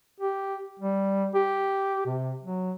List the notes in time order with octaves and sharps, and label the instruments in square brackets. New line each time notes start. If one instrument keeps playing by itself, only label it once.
[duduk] G4
G3
G4
C3
F#3